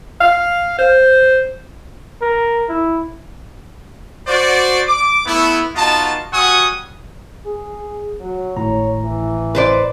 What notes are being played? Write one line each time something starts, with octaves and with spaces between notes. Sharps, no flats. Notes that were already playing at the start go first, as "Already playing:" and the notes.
F5
C5
A#4
E4
F#4 C5 D5
D6
A3 B3 E4
B3 D#4 F4 F#4 D#5 A5
G3 F#4 F#5 G#5 C#6 D#6
G#4
F#3
G#1 A2 C#5 A#5
E3
B4 C5 D5